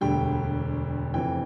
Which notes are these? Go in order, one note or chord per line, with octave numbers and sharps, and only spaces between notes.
E1 D2 D3 G3 G5
F1 F2 E3 G5